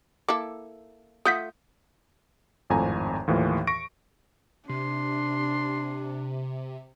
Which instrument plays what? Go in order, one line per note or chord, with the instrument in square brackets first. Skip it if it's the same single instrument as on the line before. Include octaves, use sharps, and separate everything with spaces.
[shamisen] A#3 E4 A4 [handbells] D6
[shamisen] A3 F4 F#5 [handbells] D#6 G6 B6
[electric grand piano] G#1 F2 A2 G#5 A#5
D#2 A2 E3 F3
C#6 A#6 D7
[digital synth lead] C3 [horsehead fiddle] D4 [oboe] C6